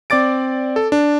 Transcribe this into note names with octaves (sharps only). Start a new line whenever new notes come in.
C4 D5 D6 A6 D7
A4
D4